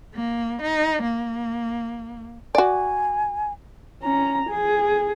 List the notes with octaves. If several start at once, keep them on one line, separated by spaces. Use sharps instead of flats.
A#3
D#4
A#3
F#4 D5 G#5
C#4 A#5
G#4